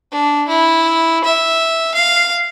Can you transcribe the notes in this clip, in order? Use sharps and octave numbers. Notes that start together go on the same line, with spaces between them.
D4
E4
E5
F5